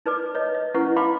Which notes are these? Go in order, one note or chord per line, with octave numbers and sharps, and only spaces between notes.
D#4 B4 D5 D6
B4 C#5 D#5
D#5
C#4 E4 B4 F#5 C#6
D#4 F5 G5 B5 C6 D6